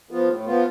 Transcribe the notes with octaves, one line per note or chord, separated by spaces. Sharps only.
F3 B3 F4
A2
F3 B3 F4